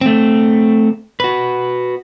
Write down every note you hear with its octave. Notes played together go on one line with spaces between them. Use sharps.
A3 C4
F#4 B4